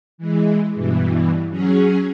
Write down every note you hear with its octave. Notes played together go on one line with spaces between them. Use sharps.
E3 G#3
G2 B2 E3
F#3 C#4 G#4